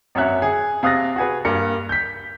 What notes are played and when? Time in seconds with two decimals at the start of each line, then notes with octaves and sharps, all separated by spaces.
0.15 G#1 F#2 C#4 E5 F#6
0.42 G#4
0.83 C3 F5 D#6 F#6 A6 A#6
1.16 F#4 G#4 B4
1.45 G2 A#3 C#7
1.89 G6 B6